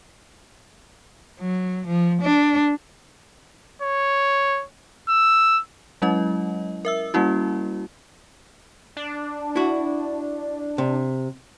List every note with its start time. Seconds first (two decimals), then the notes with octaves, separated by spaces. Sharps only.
1.40 F#3
1.87 F3
2.22 D4
3.82 C#5
5.09 E6
6.02 F#3 G#3 C#4 E4 D#5
6.85 A#4 E5 E6
7.14 G3 A#3 C#4 E4 F#4
8.97 D4
9.56 E4 F#4
10.78 C3